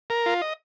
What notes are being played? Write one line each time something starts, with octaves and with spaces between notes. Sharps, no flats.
A#4
F4
D#5